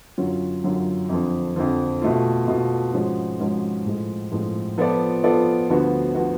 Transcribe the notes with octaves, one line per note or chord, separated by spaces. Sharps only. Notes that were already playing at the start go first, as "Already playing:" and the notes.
F#2 D3 F#3 C#4 F4
F#2 D3 F#3 C#4 F4
F2 D3 F3
F2 D3 F3
B2 A3 F4
B2 A3 F4
G#2 F3 G#3 C#4 F#4
G#2 F3 G#3 C#4 F#4
A2 F3 G#3
A2 F3 G#3
F3 B3 F4 A4 D5
F3 B3 F4 A4 D5
D2 D3 F3 B3 F#4
D3 F3 B3 F#4